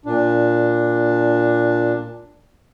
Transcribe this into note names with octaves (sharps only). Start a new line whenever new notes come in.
A#2 D4